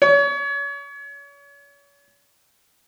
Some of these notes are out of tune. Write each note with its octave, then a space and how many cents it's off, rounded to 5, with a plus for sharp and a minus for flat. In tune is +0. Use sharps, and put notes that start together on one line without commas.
C#5 +35